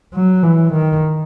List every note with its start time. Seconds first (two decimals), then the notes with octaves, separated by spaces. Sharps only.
0.14 F#3
0.43 E3
0.73 D#3